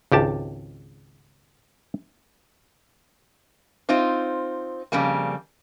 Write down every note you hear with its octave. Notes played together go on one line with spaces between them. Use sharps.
G#1 C#2 G4 A5
C4 D#4 F4 C5
F2 C#3 G3 A#3